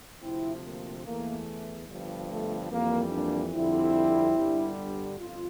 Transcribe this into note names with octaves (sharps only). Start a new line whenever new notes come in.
D2 C3 F3 C4 E4
A#3
E2 E3 A3 A#3
G1 G2 F3
A3
F2 E3 G3 A#3
A#3 D4
F2 D3 G3 C4 E4
G1 G2 D3 G3
G1 F2 F4